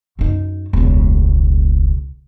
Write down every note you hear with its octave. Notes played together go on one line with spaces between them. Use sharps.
F#2 D#4
E1 C#2